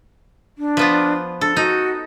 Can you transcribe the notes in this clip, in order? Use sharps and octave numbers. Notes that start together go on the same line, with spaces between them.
D4
F3 B3 F4
D4 A4
D#4 F#4